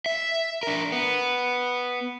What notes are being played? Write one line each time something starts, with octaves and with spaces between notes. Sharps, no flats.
E5
D4 A#4
B3